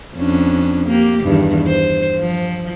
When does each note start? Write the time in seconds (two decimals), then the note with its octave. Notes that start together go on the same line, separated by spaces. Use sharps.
0.16 F2 C#4 D4
0.87 A#3 G4
1.23 E2 G2 D#3
1.68 C5
2.20 F3